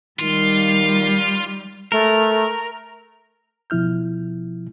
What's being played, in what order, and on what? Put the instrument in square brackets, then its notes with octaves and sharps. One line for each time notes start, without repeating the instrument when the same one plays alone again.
[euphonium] D#3 [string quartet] G3 [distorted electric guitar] F4
[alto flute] A3 [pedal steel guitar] A#4
[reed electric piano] B2 F3 E4 F6 G6